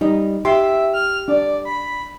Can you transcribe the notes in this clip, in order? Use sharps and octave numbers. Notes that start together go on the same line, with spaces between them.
G3 D#4 D#5
G4 E5 C6
F6
D4 D5
B5